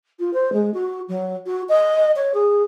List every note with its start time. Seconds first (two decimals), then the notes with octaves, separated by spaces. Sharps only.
0.19 F4
0.33 C5
0.52 G#3
0.74 F#4
1.08 F#3
1.46 F#4
1.68 D#5
2.16 C#5
2.34 G#4